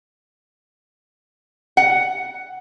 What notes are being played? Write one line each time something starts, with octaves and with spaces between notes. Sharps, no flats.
F#5